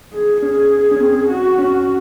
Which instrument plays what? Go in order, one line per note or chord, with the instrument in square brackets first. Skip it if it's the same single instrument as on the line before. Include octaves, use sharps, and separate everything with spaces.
[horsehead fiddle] G#4
[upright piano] C#4 [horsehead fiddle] G#4
[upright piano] C#4
C4
[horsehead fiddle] F#4
[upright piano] C#4